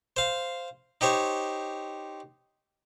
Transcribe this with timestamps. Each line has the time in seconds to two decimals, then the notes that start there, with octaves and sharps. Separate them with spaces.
0.17 C5 F5
1.01 D#4 G4 C5 C#5